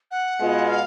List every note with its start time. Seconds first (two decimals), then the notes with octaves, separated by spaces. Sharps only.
0.11 F#5
0.39 B2 G#3 B3 F4
0.68 F5